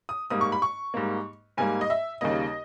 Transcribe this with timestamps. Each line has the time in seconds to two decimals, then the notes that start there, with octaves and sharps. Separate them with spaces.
0.09 D#6
0.30 G#2 G3 A#3 D#6
0.41 C#6
0.52 B5
0.62 C#6
0.94 G#2 G3 A#3
1.57 G#2 G3 A#3 G#5
1.81 D#5
1.90 E5
2.21 D#2 C#3 G3 A#3 D#5